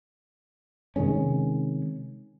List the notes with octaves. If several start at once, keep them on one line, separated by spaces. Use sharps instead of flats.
C3 D#3 G#3 C#4